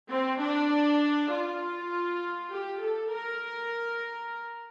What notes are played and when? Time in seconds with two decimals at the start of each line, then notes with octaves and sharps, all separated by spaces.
0.12 C4
0.42 D4
1.32 F4
2.52 G4
2.82 A4
3.12 A#4